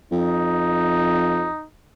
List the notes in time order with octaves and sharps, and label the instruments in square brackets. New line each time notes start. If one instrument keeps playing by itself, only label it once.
[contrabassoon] F2 [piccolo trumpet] D#4